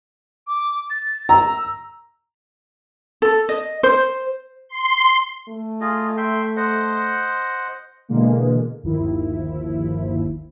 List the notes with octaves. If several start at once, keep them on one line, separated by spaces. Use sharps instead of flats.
D6
A6
A#5 E6
A4
D#5
C5
C6
A3
F4 G#4 D#5
E5 G5 C6
C5 D#5 F#5
B2 D3 E3 G#3 A#3
G1 D#2 D#3 F3 E4